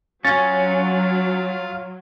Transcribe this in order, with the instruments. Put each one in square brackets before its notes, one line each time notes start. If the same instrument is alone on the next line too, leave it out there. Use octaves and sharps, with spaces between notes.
[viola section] F#3 [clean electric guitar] C#4 [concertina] F4 F5 [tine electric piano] A6